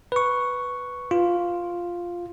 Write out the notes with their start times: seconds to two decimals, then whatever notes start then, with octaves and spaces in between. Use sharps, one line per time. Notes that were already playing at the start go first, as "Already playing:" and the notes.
0.12 B4 C#6
1.11 F4